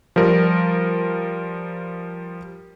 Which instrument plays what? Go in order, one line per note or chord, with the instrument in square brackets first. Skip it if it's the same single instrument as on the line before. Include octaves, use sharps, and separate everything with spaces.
[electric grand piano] F3 G3 A#4